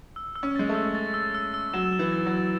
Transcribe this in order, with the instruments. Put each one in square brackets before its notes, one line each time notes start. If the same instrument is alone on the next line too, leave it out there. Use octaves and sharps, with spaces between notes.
[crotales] E6
E6
[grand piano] C#4
[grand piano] G#3 [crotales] A6
[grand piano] A3
[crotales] E6
A6
E6
E6
E6
[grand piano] F#3 [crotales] E7
[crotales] E6
[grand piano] E3
[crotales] A6
[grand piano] F#3
[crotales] E6